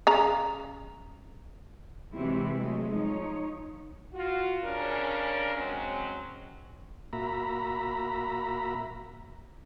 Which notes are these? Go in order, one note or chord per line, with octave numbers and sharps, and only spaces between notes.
C#3 A#5
C3 E3 F#3 G#3 C4 E4
F#3 G#3 A3
F3 D#4 C#5
F4 F#4
G2 C#3 C#4 D4 A#4
F#3 G#3 C4 C#4
A#2 A#3 F#4 E5 A#5 B5